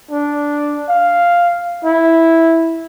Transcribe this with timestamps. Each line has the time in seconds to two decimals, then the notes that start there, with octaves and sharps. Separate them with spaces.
0.11 D4
0.89 F5
1.84 E4